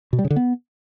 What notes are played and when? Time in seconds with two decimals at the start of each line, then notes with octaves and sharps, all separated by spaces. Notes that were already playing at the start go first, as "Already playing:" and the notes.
0.13 B2
0.19 G3
0.25 C#3
0.30 D3
0.36 B3